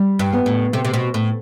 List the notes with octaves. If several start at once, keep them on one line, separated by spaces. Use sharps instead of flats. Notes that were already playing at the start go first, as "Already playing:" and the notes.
Already playing: G3
G2
B3
A2
C3 A3
C3
B2
A2